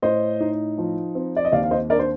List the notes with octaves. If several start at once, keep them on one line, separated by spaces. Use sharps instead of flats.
A2 C5 D#5
D#4
F3
C4
D5
D#5
D#2 D5 F5
F5
C5 D#5
D4 A#4 D5
C5